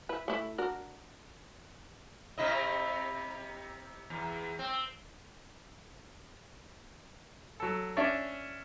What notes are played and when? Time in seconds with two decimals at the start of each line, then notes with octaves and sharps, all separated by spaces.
0.09 E4 B4
0.28 A3 E4
0.58 D4 F#4 A#4
2.38 C3 E4 D#5
4.10 E2
4.59 C4
7.60 F#3 A4
7.97 C#4 D4 D5 E5